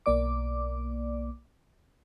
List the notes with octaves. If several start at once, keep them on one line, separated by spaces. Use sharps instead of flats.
B1 A#3 D5 D6